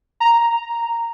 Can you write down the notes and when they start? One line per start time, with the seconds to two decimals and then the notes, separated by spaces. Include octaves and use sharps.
0.20 A#5